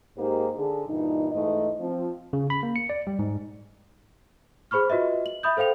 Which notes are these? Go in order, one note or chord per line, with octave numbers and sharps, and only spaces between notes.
G#2 A#3 D#4 G4 G#4 C5
D3 G#4
G2 A#2 E3 D#4
G#2 E3 A3 D#5
F3 C4 F4
C#3
B5
A#3
C#7
D5
G3
G#2
G#4 C5 B5 C#6 F6
F4 F#4 B4 D#5 E5
F#7
E5 B5 D#6 G6
A4 C5 F5 G5 F7